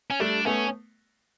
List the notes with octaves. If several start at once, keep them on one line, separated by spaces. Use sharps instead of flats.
C#4
G3 A3 D4
A3 B3 C#4